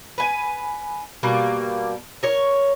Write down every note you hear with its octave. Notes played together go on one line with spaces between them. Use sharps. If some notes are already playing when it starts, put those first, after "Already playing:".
B4 G#5
B2 G3 A#3
A#4 C#5